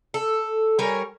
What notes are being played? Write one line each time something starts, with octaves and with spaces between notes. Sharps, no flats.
A4
G3 A#4 C#5 G#5